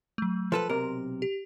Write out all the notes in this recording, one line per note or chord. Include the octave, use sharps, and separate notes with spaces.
F#3 A3
F3 A4 B4 C6
B1 C3 A#4
G4